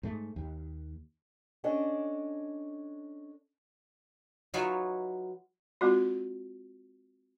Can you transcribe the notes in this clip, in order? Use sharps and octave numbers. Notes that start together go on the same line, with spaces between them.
G#2 A3
D#2
C#4 D4 A4 D#5
F#3 D#4 F4 B4 C#5 E5
G#3 C4 F4 F#4